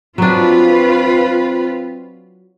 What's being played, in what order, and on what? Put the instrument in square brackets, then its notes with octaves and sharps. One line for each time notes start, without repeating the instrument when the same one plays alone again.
[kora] F#3 D4 [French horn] C4 [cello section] F4 B4